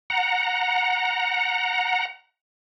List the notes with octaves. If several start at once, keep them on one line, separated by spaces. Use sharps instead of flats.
F#5 A#5